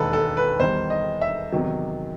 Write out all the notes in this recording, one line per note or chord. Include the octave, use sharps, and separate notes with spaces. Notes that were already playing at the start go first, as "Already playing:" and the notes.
Already playing: E1 D#2 D#3 A4 B4
A4
B4
E2 D#3 G3 C5
D#5
E5
E2 C3 D#3 F#3